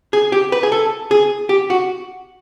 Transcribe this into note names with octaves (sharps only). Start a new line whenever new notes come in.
G#4
G4
B4
G#4
A4
G#4
G4
F#4